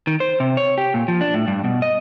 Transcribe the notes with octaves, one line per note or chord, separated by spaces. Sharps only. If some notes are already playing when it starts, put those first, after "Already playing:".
D#3
C5
C3
C#5
G4
A#2
F3
D4
A2
G2
B2
D#5